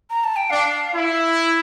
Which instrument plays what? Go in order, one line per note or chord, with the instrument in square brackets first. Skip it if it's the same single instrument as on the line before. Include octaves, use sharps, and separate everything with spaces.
[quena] A#5
A5
G5
[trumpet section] D4 [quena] F5
[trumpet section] E4